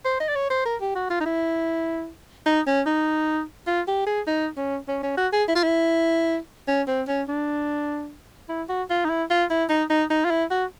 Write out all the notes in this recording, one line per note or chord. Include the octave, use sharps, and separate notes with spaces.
C5
D#5
D5
C#5
C5
A#4
G4
F#4
F4
D#4
E4
D#4
C#4
D#4
F4
G4
G#4
D#4
C#4
C#4
C#4
F#4
G#4
E4
F4
E4
C#4
C4
C#4
D4
E4
F#4
F4
D#4
E4
F4
E4
D#4
D#4
D#4
F4
E4
F#4